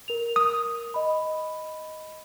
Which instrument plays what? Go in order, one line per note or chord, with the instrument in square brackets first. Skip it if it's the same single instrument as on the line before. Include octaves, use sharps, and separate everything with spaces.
[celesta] A#4 F7
[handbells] D#6
[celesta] D#5 B5